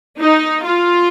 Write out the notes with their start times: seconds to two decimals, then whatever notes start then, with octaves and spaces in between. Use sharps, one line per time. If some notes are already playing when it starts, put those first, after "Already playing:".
0.19 D#4
0.65 F4